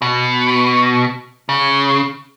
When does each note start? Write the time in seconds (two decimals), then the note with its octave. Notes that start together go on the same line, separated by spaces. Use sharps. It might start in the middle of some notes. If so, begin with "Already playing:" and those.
0.02 B2
1.49 C#3